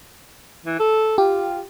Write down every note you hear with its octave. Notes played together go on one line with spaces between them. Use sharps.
E3
A4
F4 G4